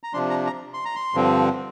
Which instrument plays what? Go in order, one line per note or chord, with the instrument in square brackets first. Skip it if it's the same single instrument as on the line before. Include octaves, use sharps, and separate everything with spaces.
[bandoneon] A#5
C3 F3 D4 C6
A#5
A#5
C6
A#5
C6
G2 D3 F3 C4